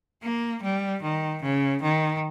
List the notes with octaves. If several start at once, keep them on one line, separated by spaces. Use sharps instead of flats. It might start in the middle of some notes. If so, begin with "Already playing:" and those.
A#3
G3
D#3
C#3
D#3